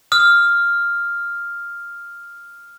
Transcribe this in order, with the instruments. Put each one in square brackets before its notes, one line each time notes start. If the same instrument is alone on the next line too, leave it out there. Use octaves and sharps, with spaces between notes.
[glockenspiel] D#6 F6